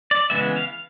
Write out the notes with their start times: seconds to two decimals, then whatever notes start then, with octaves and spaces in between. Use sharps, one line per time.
0.11 D5
0.30 C#3 E3 G#3 B3 E5
0.56 F5